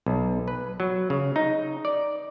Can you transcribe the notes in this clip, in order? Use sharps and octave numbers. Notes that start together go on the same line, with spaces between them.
B1
B4
F#3
C#3
D#4
D5